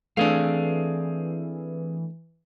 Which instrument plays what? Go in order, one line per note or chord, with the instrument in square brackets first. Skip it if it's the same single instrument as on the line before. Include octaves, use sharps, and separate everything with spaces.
[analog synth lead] E3 [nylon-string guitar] A3 D4 [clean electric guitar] C4 G#4 F5